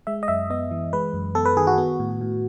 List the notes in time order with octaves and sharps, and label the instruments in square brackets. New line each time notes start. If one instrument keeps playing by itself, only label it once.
[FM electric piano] G#3 E5
D#5
F#2 E5
B3 D#5
E3
G#3 B4
F#2
B3 A4
B4
D#3 G#4
F#4
B3
A2
A2